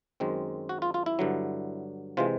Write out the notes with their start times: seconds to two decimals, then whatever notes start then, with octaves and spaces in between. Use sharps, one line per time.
0.20 F#2 D#3 G#3 C4
0.69 F#4
0.82 F4
0.94 F4
1.06 E4
1.19 G2 D3 F#3
2.17 C3 E3 G#3 F4